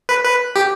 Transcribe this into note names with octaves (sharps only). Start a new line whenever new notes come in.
B4
B4
G4